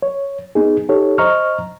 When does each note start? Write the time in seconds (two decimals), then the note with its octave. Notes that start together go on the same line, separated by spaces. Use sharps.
0.02 C#5
0.55 B3 D#4 G#4
0.89 D#4 G4 A4 C#5
1.18 C5 D#5 A#5 C#6 F6